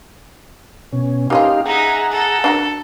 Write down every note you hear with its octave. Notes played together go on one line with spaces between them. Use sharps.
B2 C#4
A#3 C#4 D#4 F4 G4 F5
D#4 G#4 E5 F#5 A#5
A4
D4 F#4 A#4